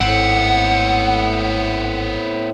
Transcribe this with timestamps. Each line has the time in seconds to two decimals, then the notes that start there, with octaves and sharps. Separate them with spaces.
0.01 G#1 A2 B3 C4 F#5